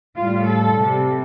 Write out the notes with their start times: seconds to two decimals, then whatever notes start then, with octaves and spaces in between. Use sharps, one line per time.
0.16 A2 G3 F4
0.45 A4
0.76 C3 G3